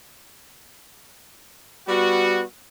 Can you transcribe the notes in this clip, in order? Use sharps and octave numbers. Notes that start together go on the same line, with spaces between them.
G3 B3 F#4